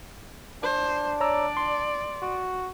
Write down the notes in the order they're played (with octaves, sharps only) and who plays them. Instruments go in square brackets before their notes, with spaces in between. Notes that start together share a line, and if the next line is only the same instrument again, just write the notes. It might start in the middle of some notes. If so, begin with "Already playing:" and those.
[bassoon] D4 [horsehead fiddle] C5
[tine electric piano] C#5 A#5 E6 [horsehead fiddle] D5
[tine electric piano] C6
[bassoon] F#4